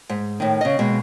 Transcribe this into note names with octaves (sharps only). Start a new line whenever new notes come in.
G#2
A2 D#3
C#3 D#5
D#2 B2 G#3